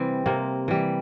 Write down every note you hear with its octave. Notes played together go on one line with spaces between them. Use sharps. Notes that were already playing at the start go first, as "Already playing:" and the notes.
Already playing: C3 E3 G3 C4
C3 A#3
E3 G3